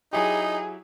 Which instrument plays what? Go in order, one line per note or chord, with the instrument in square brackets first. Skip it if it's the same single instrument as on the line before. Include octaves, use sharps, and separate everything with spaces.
[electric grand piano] F#3 E4 G4 [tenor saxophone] D#4 [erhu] G#4